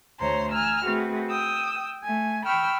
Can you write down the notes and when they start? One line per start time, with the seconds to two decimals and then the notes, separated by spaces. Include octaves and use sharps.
0.20 D2 A3 C5 C#5 A#5 C6
0.52 G#5 A#5 E6 F6
0.84 A3 C4 F#4 G#4 B4
1.30 G5 D#6 E6
2.03 A3 G#5
2.46 G5 B5 C#6 E6 F6